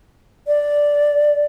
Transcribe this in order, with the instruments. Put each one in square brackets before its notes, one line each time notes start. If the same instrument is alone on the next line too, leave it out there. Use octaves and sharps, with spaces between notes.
[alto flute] D5